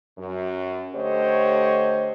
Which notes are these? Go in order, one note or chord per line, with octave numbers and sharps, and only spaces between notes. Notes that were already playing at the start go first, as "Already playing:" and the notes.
F#2
D3 A3 G4 C5 C#5 D#5